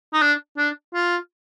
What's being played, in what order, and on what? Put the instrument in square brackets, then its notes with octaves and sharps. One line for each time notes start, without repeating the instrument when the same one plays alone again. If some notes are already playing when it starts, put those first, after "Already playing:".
[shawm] D#4
D4
D4
F4